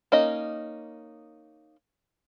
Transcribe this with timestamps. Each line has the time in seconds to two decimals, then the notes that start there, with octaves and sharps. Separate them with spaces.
0.12 A#3 C#4 D#4 D#5